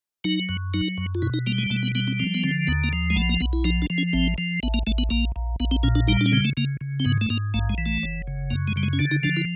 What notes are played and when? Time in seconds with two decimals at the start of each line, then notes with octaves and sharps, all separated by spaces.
0.24 F#3 D#4
0.49 F#2
0.74 F#3 D#4
0.97 F#2
1.15 F4
1.22 B2 E4
1.34 D#4
1.47 G3 A#3
1.58 G#3
1.70 B2 A3
1.83 B3
1.95 G3 B3
2.08 C4
2.20 F3 C4
2.34 B3
2.44 D3 C4
2.67 D#2 B3
2.84 A#3
2.93 F3
3.10 G#3
3.16 B1 A3
3.29 A#3
3.40 B1 B3
3.53 E4
3.65 F3 D#4
3.82 D4
3.90 F3
3.98 C#4
4.13 A1 C4
4.38 F3
4.63 A1 B3
4.74 A#3
4.87 A1 A3
4.98 B3
5.10 A#1 A#3
5.36 A#1
5.60 A#1 B3
5.71 C4
5.83 A#2 C#4
5.95 D4
6.08 G3 D#4
6.21 D4
6.26 C#4
6.33 C#3 C4
6.45 A3
6.57 C#3 A#3
6.81 C#3
7.00 C4
7.05 G#2 B3
7.21 A3
7.30 G#2 A#3
7.54 A#1 A3
7.70 G#3
7.78 E3
7.86 A3
8.03 F#1
8.27 C#3
8.51 F#2 A#3
8.68 G#3
8.76 C#3 G3
8.83 G#3
8.93 C#4
8.99 D3 D4
9.11 D#4
9.23 F3 D4
9.37 E4